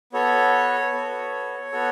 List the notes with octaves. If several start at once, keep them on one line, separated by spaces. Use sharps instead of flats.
B3 F#4 A4 C#5
B3 F#4 A4
B3 F#4 A4